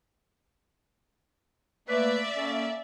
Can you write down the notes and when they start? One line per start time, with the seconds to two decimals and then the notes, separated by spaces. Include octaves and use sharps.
1.89 A3 A#3 B4 D5 E5
2.36 A#3 C#4 A4